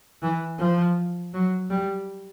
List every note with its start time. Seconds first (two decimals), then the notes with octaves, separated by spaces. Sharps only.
0.22 E3
0.59 F3
1.34 F#3
1.70 G3